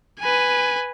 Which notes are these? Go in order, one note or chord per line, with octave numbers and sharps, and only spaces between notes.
B4 G#5